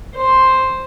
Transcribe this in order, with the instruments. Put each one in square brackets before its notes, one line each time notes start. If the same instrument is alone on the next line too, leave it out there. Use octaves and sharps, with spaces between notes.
[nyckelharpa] C5